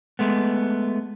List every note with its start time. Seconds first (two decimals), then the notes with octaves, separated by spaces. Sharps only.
0.19 G#3 A3 B3